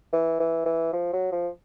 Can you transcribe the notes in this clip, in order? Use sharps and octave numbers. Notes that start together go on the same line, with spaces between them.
E3
E3
E3
F3
F#3
F3